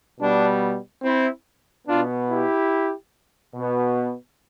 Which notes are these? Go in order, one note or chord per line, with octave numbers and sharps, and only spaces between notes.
B2 G3 B3 D4
C4 E4
B2 B3 D4 F4
E4 G4
B2 B3